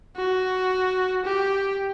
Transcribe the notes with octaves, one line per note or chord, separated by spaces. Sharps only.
F#4
G4